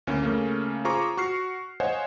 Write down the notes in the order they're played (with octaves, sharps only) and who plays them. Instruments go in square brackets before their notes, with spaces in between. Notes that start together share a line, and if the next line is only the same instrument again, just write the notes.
[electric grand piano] D2 A#3 C#4 E4
C#3 A3 A#3 C#4
F4 G#4 C5 A#5 C#6 D6
F#4 C#6 F6 C7
C5 C#5 D#5 F5 F#5 G#5